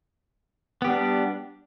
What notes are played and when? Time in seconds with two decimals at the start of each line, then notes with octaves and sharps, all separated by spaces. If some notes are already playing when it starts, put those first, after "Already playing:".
0.82 B3
0.84 G4
0.87 G3
0.90 D4